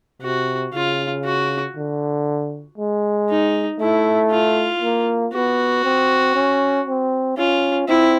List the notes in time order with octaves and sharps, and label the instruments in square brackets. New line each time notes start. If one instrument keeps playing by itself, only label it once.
[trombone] C3 [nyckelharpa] F#4
[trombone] C#3 [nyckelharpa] F4
[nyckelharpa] F#4
[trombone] D3
G#3
[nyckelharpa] D#4
[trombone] A3 [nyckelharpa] E4
[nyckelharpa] F4
[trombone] A#3
[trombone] B3 [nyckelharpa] F#4
[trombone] C4
C#4
C4
[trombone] C#4 [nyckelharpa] F4
[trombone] C4 [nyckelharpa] E4